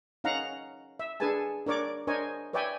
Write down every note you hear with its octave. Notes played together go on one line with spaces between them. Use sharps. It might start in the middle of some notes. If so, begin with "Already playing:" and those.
C#4 D#4 F5 F#5 A#5
E5
D4 G#4 A4 B4 G#5 A5
D4 A#4 C#5 D5 D6
D4 A#4 C5 C#5 D#5 G#5
B4 C#5 D5 E5 G5 G#5